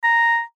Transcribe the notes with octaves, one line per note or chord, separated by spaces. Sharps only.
A#5